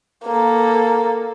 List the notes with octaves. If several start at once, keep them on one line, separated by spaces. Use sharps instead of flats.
A#3 A4